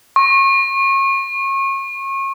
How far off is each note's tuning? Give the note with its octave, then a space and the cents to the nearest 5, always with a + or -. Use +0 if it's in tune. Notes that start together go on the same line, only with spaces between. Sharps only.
C#6 -35